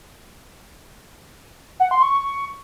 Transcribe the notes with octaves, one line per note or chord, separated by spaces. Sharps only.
F#5
C6
C#6